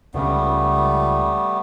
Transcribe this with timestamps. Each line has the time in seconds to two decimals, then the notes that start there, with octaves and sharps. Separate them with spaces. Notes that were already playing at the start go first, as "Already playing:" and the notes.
0.14 C#2 C#3 G3 A3 B3 C#4